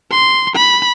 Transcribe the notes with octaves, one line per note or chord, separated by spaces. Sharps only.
C6
B5